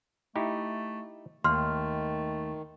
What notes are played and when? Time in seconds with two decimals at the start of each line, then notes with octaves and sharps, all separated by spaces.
0.36 A3 D#4 E4 G4
1.44 D#2 D#3 A3 C6 F6